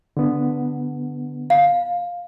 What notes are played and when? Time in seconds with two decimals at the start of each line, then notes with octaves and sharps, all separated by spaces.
0.17 D3 B3
1.50 F5